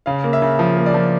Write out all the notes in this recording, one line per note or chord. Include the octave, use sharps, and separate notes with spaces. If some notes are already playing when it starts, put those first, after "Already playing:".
C#3 F5
A#3
E5
C#3
F3
A#3
D5
F3